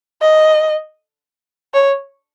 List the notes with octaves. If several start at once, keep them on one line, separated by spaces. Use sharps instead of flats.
D#5
C#5